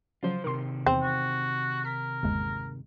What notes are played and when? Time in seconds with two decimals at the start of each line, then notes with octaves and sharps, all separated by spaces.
0.23 C#3 F3 F#3 F4 C5
0.44 C3 D#3 A#4 C6
0.86 E2 C4
1.02 F#4
1.85 A#4 B6
2.23 G1 D#2 G#3